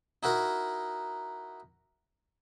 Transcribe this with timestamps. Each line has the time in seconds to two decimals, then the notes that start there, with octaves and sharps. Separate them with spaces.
0.23 D#4 E4 F#4 A#4